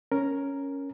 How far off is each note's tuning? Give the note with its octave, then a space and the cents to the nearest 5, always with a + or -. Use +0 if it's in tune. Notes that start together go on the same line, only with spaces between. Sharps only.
C#4 +0 A#4 +0